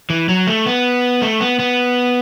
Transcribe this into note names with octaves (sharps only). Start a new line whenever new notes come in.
E3
F#3
A3
B3
A3
B3
B3